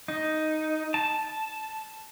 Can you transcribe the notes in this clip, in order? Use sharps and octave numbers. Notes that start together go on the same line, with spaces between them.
D#4
A5